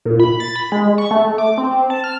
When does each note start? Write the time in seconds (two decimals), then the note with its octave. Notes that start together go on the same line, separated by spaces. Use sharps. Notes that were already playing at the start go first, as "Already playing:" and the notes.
0.05 A#2
0.20 B5
0.40 A6
0.56 B5
0.72 G#3
0.98 C#6
1.11 A3
1.38 D6
1.58 C4
1.90 A5
2.04 F6